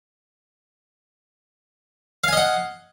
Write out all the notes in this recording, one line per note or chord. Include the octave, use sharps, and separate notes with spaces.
D#5 F5 F#5 G#5